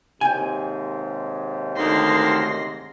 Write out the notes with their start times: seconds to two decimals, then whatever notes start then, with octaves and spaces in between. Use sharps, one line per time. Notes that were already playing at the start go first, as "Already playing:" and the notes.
0.21 D#2 G#2 C3 G5 G#5
1.76 D2 D#3 C6 A#6